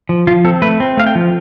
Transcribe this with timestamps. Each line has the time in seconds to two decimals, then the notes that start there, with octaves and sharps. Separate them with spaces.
0.09 F3
0.27 F3 F4
0.45 C4 A4
0.62 A3 B4
0.80 C4
0.97 A3 F5
1.06 G5
1.15 F3